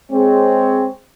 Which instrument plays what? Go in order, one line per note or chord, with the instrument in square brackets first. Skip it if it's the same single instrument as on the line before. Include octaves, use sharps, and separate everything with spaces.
[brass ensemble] G#3 C4 G#4 C#5